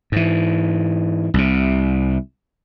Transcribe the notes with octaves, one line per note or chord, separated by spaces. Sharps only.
G#2 E3
C2 C3